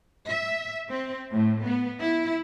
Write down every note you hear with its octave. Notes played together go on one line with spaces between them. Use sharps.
E5
C4
A2
B3
E4